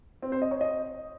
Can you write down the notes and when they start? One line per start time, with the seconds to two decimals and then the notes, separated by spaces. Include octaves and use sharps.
0.22 C4
0.32 C5
0.42 D#5
0.51 C#5
0.61 D#5